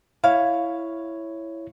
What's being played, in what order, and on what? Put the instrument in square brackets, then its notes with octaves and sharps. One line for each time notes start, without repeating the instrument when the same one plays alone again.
[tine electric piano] E4 C#5 [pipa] F5